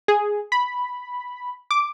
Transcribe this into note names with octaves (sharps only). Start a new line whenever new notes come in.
G#4
B5
D6